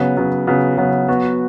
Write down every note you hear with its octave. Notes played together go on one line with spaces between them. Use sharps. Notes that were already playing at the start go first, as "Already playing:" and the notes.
Already playing: C#3 F#3 B3
C#3 F#3 B3
C#3 F#3 B3
C#3 F#3 B3
F#3 B3 F#4